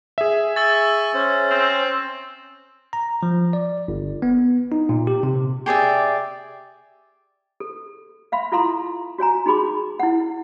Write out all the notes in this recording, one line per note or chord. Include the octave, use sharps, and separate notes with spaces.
G#4 E5
G#5 C#6 E6 A6
C#4 C5
C4
A#5
F3
D5
G1
B3
D#4
A#2
G4
C3
G4 G#4 D5 E5
A4
E5 F5 B5 C6
E4 F4 A4 F5 A#5 C6
F#4 C#5 G#5 A#5
D#4 F#4 G#4 B5 C6 D6
E4 F#5